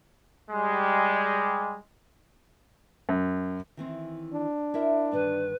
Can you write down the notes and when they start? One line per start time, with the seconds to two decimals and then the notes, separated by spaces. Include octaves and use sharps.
0.50 G3 G#3
3.09 F#2
3.77 D#3 E3 C4
4.33 D4
4.74 E4 A#4 E5
5.12 G2 D3 D#3 B4